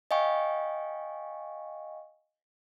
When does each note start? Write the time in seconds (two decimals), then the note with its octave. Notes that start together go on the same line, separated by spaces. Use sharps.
0.11 D#5 F5 G5 G#5 C#6